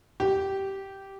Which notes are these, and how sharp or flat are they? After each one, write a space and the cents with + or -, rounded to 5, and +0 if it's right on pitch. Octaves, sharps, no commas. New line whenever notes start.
G4 -10